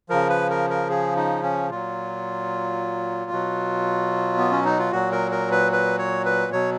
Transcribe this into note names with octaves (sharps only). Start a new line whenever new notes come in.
C#3 F3 A#4
B4
A#4
A#4
G#4
D#4
C#4
A#2 F#3 F4
B2 F#3
B3
C#4
D#4
F4
A#2 F#3 F#4
A#4
A#4
B4
B4
C#5
B4
B2 F#3 C#5